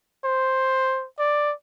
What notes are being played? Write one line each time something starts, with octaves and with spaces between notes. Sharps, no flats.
C5
D5